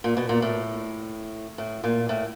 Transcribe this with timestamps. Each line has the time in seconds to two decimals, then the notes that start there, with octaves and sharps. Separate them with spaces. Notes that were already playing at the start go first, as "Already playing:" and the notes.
0.04 A#2
0.17 B2
0.29 A#2
0.42 A2
1.58 A2
1.84 A#2
2.09 A2